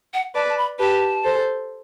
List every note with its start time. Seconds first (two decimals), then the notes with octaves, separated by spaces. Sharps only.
0.14 F#5
0.35 B4 D5 A5
0.49 A5
0.58 B5
0.79 G4 B4 A5
1.24 A4 C5